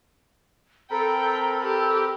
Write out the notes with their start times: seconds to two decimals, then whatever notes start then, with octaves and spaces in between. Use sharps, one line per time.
0.91 C4 A4 A#4 G5 A#5 B5
1.63 G4 E6